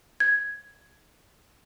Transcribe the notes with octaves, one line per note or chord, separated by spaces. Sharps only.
G#6